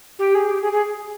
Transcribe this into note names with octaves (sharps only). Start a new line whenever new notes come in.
G4
G#4
G4
G#4
G#4